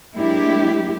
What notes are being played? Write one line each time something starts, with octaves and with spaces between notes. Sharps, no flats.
F#3 G#3 A#3 D4 E4 G4